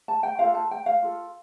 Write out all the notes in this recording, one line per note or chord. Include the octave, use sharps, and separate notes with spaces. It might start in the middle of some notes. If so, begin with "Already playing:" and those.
A5
G5
F4 A4 F5
A5
G5
F5
F4 A4